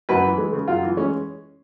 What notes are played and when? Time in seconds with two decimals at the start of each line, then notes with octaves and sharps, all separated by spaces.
0.09 F#2 B4
0.24 E3
0.38 G#3
0.53 C#3
0.68 F#2 F4
0.83 E3
0.97 G#3 C#4